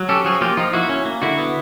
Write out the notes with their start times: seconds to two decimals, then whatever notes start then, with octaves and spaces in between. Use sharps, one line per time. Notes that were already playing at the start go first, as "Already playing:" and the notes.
Already playing: F#3
0.09 C#4 G4 A4
0.25 F3 F#4 G#4
0.41 A#3 F4 G4
0.57 F3 D#4 F4
0.73 A#3 E4 F#4
0.89 C#4
1.05 A#3
1.22 D3 E4 F#4
1.38 B3